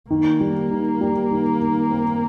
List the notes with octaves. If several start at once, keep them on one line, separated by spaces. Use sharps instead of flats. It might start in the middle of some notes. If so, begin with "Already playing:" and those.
D#3 A#3
G3
D#3
G3
D#3
D#3
C4